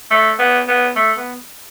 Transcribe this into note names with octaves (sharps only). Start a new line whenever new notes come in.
A3
B3
B3
A3
B3